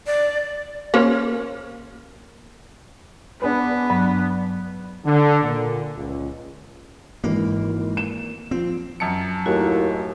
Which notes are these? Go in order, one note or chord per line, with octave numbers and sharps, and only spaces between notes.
D5
A#3 C#4 C5
B3 D4 G#4 B4
G2 F#3
D3
A#2
C#2
G#1 E3 A#3
E7
F3 C4
F#2 A5 C#7
D#2 A2 F#4